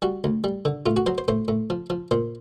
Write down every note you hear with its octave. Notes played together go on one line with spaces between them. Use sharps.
G3 F#4
D2
G3
D3
A2 F4
F#4
F#3 C5
C5
A2 C5
A2
F3
F3
A#2 C5